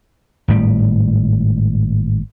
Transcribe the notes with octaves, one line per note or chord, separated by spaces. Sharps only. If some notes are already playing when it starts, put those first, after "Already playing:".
G#1 A2 G3